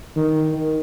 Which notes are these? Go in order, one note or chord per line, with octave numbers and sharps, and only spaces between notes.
D#3